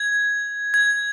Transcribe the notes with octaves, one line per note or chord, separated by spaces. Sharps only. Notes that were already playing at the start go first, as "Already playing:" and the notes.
Already playing: G#6
G#6